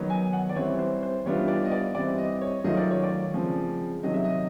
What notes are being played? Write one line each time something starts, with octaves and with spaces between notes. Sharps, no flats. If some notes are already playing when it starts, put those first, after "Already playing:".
Already playing: D#3 F#3 B3 D#4
G#5
F#5
D5
E3 G3 C4 C#5
C5
C5
E3 G3 B3 D4 F4 C#5
D5
D#5
D5
E3 G3 C4 D5
D#5
C#5
D#3 F#3 A3 C#4 F4 D#5
D5
C#5
D5
C#3 F3 G#3 C4
C3 D#3 F#3 D#5
E5
D#5